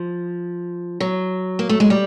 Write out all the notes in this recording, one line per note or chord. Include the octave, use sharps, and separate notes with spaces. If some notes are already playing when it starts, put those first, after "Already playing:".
Already playing: F3
F#3
A#3
A3
G#3
G3